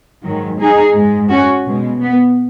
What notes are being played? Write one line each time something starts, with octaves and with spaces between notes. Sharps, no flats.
G#2 D#3 F#3
D#4 G#4
G#2 G#3
C#4 F#4
B2 G#3
B3